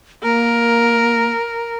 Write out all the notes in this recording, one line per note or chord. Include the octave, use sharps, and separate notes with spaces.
A#3 A#4